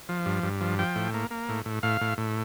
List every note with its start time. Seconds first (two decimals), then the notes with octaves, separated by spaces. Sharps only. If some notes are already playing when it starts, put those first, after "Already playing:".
0.09 F3
0.26 G2
0.43 G2
0.61 F3
0.79 F3 G5
0.96 A2
1.14 A#3
1.31 A#3
1.49 A2
1.66 A2
1.83 A2 F5
2.01 A2
2.18 A2